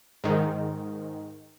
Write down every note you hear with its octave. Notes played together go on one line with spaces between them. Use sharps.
G#2 D#3